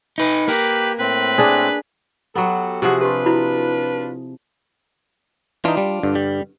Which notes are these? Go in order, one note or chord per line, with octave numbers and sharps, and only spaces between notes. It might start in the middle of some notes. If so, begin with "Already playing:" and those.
D#4 B4
A#3 G4 A#4 B4
A2 C4 B4
D4 G#4
F#3 B3 F#4 G4 A4
C3 F3 F#4 G#4
D4 F4 G4 B4 C6
E4 F#4 B5
E3 D4 D#4 F4
G3
G2 D3
G3